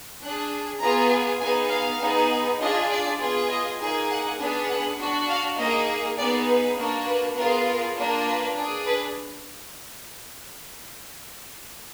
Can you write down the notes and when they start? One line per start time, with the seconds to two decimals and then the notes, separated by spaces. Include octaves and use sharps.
0.22 D4 G#4 F#6
0.82 B3 F4 G#4 A#5
1.41 B3 D#4 G#4 G#5
1.71 F5
2.01 B3 D#4 G#4
2.60 D4 F4 G#4 D#5
2.91 D5
3.20 B3 F4 G#4
3.50 D#5
3.80 A#3 D#4 G#4
4.09 F#5
4.39 B3 D4 G#4
4.69 F#5
4.99 D4 F#4
5.29 F5
5.58 A#3 D#4 G#4 D#5
6.18 B3 D#4 G#4 D5
6.48 B4
6.77 A#3 D4 F#4
7.07 B4
7.37 B3 F4 G#4 A#4
7.66 A#4
7.97 A#3 D4 F4
8.27 B4
8.57 D4 G#4
8.86 B4